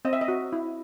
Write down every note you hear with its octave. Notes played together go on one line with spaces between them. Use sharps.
C4 D#5
E5
D#5
F#4
E4